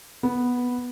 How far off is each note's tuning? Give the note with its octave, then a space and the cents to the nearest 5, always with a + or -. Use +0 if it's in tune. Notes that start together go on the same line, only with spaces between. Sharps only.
B3 -5